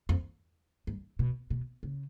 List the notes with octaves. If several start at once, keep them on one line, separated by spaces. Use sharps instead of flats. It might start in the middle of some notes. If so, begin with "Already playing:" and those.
F2
G2
B2
B2
C#3